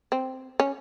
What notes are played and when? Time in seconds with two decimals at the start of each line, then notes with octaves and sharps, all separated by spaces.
0.12 C4
0.60 C#4